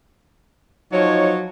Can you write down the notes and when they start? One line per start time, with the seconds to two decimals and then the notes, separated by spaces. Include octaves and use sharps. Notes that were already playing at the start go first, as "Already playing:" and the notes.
0.92 F3 F#3 D#4 C#5